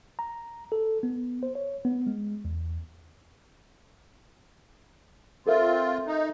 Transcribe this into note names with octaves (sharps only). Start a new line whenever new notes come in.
A#5
A4
B3
C5
C#5
B3
G#3
E2
C4 F4 A4 A#4 E5
D#4